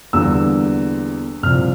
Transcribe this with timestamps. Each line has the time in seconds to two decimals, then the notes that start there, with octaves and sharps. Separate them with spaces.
0.13 E2 D3 G3 A#3 E6
1.43 C2 A#2 F3 F6